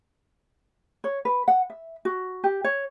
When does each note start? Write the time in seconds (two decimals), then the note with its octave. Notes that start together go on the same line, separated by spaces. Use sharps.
1.04 C#5
1.25 B4
1.48 F#5
1.70 E5
2.05 F#4
2.44 G4
2.64 C#5